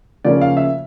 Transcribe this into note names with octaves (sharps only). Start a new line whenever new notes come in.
C#3 F3 A#3 C#4 F4 D5
F5
E5